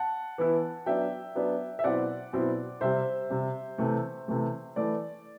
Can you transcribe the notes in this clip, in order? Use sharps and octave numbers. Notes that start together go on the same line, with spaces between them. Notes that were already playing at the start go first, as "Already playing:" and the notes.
Already playing: F#5 A5
E3 B3 E4
F#3 B3 D4 E5 G5
F#3 B3 D4
E5
B2 F#3 C4 E4 D5 F#5
B2 F#3 C4 E4
C3 G3 C4 C5 E5
C3 G3 C4
C3 E3 A3
C3 E3 A3
E3 A3 E4 D5